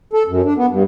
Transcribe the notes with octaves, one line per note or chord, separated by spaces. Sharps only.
A4
F#2
D4
B3
G2